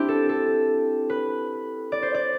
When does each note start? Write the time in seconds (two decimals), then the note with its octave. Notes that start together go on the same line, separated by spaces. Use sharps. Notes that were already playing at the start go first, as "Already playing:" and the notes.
Already playing: C4 D4 E4 G4
0.08 A4
0.29 A4
1.10 B4
1.92 D5
2.02 C5
2.14 D5